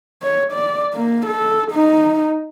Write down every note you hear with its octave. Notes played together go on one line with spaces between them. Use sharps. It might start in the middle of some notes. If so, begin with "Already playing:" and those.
C#5
D5
A#3
A4
D#4